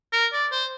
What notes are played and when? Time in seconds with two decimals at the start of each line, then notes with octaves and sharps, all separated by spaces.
0.13 A#4
0.33 D5
0.52 C5